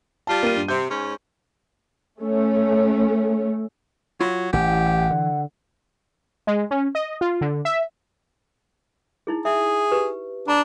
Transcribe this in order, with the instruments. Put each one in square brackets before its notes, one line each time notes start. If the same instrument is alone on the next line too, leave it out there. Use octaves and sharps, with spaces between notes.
[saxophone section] G3 F4 [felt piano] A5
[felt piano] A#3 D#7
G2
[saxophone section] C3 [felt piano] G6
[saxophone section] G#2 C#4
[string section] A3 C#4
[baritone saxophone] F#3 [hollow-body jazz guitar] F4 B5
[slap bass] A1 [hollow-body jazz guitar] E3 [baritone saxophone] G4 [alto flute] F#5
[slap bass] D3
[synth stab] G#3
C#4
D#5
F4
D3
E5
[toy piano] D#4 E4 G#4
[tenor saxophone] G#4 [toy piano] E5
[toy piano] G4 B4
[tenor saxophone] D4 [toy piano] A#5